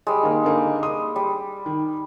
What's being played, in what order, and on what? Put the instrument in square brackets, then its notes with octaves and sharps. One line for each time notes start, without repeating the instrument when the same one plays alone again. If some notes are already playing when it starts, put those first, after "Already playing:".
[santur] G3 G#3
[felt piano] D#3 A#3
D3 A#3 D#4
C6 D#6
[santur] G3
[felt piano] D#3